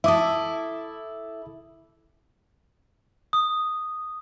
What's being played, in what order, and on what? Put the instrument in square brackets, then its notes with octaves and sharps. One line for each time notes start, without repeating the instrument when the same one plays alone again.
[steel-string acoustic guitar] E4 A4 [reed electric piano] E5 D6 D#6
[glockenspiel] D#6